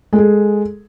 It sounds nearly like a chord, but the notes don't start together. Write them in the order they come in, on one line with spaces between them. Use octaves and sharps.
G#3 A4 G#4